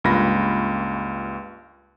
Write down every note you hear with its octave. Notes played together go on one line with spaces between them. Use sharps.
C#2 G2 A#3 F4 B5 A#6